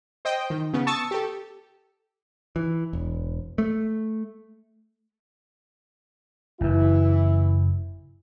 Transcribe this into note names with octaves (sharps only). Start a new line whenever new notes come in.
C5 D#5 G5
D#3
C#3 B3
A5 C#6 D#6 E6 A6
G4 A4
E3
E1
A3
F#1 F#2 E3 E4